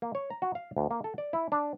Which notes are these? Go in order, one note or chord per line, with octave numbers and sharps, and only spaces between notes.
A#3
C#5
A#5
F#4
F5
D2
A#3
A4
D5
E4
D4